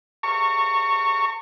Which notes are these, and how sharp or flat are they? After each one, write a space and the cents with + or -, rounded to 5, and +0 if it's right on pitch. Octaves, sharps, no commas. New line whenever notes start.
A#5 -40 C#6 +0